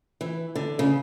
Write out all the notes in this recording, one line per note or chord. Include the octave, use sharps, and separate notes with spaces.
E3
D3
C#3